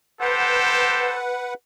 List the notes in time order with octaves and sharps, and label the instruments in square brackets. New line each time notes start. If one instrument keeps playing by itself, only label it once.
[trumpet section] G4 A4 C5 [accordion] B4 F#5